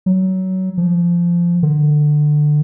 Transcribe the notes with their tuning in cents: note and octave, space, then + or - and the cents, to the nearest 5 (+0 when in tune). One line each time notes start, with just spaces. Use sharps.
F#3 +20
F3 -15
D3 +20